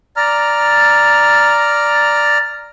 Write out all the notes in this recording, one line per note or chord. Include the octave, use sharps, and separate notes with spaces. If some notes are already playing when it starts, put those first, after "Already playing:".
D5 A#5 F6